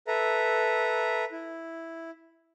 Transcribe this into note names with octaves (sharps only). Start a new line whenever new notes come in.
A4 B4 E5 A#5
E4